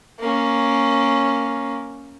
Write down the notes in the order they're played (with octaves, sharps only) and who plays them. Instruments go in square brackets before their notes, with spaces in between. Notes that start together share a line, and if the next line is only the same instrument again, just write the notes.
[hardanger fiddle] A#3 C#4